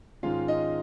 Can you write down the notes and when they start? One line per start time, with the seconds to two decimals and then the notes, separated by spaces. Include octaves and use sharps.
0.23 G#2 D#3 G#3 C#4 F4 F5
0.48 D#4 D#5